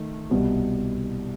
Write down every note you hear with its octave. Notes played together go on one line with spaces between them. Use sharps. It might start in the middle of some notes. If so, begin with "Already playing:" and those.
Already playing: D#3 A3
C2 B2 G3